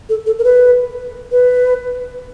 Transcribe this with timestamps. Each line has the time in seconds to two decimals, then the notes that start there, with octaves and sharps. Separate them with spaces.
0.09 A4
0.26 A4
0.39 A#4
0.44 B4
1.32 B4